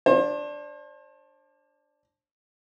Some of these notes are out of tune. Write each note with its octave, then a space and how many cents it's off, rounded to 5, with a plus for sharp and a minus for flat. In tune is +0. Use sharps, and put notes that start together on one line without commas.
D4 +0 C5 +40